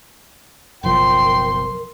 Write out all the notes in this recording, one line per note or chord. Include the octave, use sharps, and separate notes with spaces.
F#1 B1 F3 A#4 G5 C6